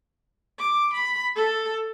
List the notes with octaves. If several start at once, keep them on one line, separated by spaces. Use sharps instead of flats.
D6
B5
A4